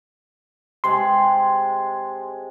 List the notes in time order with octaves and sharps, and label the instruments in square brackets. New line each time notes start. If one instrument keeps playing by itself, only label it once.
[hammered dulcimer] C3 G#3 [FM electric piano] C6